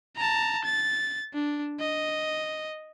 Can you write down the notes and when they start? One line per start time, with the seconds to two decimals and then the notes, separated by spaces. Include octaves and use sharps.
0.16 A5 A#5
0.64 A6
1.34 D4
1.80 D#5